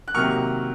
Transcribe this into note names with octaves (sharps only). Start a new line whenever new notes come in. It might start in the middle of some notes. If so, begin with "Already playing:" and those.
F#6
C3 D#3 F#3 A#3 C#6 F6